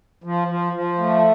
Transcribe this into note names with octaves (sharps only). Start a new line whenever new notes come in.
F3
F3
F3
A3